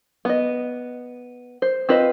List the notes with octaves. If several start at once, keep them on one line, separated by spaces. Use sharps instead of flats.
B3 D#5
C5
C4 F4 B4 C5 D#5